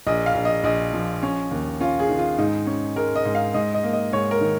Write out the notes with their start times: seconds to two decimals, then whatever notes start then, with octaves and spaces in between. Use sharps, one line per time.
0.07 A#1 D#5
0.26 F5
0.35 A#1
0.45 D#5
0.64 A#1 D#5
0.93 F3
1.23 C#4
1.51 D#2
1.80 C#4 F4
1.99 G#4
2.09 D#3
2.19 F4
2.38 G#2 D#4
2.67 C#4
2.96 G#3 A#4
3.16 D#5
3.25 G#2
3.35 F5
3.54 G#2 D#5
3.74 D#5
3.83 A#3
3.93 D#5
4.13 G#2 C#5
4.31 A#4
4.41 D#3